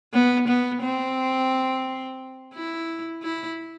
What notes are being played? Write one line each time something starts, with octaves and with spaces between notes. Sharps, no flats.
B3
B3
C4
E4
E4